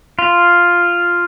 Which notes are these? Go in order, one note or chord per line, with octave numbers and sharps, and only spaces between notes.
F4